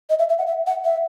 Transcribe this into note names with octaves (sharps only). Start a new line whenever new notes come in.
D#5
E5
E5
F#5
E5
F#5
E5